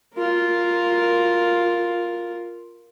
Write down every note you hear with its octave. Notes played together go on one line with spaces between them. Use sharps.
F4 A#4